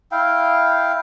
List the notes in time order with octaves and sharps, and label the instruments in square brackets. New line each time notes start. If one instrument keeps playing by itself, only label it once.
[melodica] E4 F5 G5